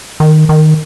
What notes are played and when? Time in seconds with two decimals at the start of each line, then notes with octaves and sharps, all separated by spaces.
0.20 D#3
0.49 D#3